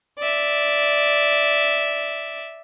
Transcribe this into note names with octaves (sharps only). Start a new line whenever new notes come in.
D5 E5